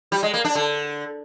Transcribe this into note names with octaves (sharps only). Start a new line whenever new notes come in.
G3
G#3
A#3
D4
D3